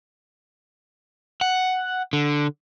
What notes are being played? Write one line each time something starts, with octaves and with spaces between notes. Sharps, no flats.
F#5
D3